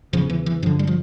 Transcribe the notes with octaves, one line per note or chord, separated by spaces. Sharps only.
E2 C#3 F3
E3
E3
G2 D3 F3
G3
F3